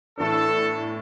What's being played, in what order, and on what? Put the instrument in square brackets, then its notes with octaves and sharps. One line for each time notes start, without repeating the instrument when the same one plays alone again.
[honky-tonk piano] A2 E3 B3 D4 [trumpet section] A4